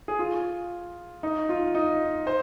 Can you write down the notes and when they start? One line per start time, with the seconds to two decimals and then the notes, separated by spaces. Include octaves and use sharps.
0.08 G#4
0.19 F4
1.23 D#4
1.49 F4
1.75 D#4
2.27 C5